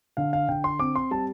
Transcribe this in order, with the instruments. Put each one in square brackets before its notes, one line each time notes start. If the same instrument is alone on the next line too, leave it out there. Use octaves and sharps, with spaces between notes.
[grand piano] D3 F5
F5
D3 G5
C6
C4 D6
C6
G3 A5